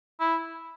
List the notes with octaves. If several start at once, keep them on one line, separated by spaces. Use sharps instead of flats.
E4